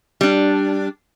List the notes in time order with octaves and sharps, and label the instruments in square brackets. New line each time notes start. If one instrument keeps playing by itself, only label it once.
[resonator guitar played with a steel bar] G3 D4